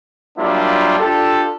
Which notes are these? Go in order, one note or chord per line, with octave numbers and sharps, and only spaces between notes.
F#3 G3 A#3 D4 E4 F4
D4 F4 G4 A4